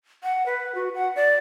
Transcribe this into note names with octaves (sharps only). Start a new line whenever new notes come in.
F#5
B4
F#4
F#5
D5